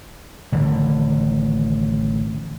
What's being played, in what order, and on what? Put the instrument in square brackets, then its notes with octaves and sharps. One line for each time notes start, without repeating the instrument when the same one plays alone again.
[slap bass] A1 D3 D#3